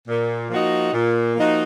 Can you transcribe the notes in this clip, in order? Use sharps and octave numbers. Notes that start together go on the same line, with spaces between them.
A#2
F3 A#3 D#4 F#4
A#2
F3 A#3 D#4 F#4